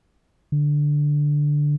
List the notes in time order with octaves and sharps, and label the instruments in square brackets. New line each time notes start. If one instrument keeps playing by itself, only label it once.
[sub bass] D3